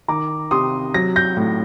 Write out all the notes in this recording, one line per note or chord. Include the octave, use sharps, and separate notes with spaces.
D#3 A#5 D6
C3 C6 D#6
F#3 A#6
G6 A#6
A2